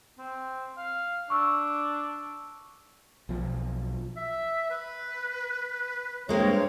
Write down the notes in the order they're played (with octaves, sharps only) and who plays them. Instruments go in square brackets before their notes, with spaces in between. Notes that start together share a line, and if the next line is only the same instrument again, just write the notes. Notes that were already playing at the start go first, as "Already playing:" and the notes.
[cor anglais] C4
F5
[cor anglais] D4 [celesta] C#6 E6
[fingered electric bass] B1 F3
[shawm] E5
B4
[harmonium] G2 C4 C#5 [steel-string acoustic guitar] G#3 A#3